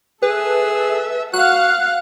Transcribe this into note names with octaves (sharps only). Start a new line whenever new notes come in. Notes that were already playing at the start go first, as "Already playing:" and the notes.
G#4 A4 B4 E5
F#4 F5 F#5 F#6